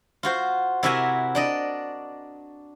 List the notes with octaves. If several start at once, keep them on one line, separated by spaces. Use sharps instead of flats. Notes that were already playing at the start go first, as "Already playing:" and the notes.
F4 F#4 C5
C3 E4 F#4 A#4 E5 G#5
D4 D5 D#5